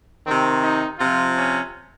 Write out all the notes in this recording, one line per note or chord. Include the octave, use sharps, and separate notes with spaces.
C3 D#3 C4
D#4
C3 F3 F4
C#4